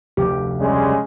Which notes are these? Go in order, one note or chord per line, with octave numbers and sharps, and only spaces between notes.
F1 D2 G4
C#3 G3 G#3